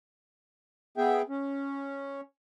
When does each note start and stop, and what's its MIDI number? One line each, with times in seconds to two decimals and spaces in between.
0.97 1.22 59
0.97 1.22 68
0.97 1.22 76
0.97 1.22 79
1.29 2.21 61